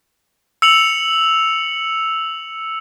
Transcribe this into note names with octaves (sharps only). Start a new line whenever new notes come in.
E6 C#7 F7 F#7